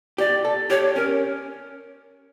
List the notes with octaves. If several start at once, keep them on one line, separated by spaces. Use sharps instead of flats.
G4 D5
A4
G4 C#5
C#4 A#4